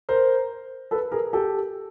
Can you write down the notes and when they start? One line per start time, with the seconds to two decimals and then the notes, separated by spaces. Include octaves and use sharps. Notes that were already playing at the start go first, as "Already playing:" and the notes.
0.09 A#4 C5
0.91 A4 B4
1.12 G#4 A#4
1.33 G4 A4